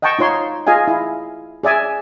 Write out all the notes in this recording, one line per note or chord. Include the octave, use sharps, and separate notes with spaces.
D#5 F#5 G5 A5 C#6
D#4 F4 C#5 C6
F4 G#4 D#5 F5 G#5
E4
G#4 D5 E5 G#5